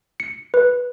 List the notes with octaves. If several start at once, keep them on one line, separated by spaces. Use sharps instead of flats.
C#7
B4